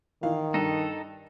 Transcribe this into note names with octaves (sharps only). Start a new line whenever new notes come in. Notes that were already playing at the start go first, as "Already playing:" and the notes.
D#3 E3 F5
G2 D#4 A4